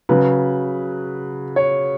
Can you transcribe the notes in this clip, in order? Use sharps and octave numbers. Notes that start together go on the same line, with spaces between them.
C#3 F#3 B4
C#5